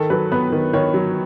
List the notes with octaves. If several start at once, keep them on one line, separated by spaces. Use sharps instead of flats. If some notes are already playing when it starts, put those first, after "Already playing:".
Already playing: D#3 A4
F#3 B4
B3 B4
D#3
D#3 C#5
F#3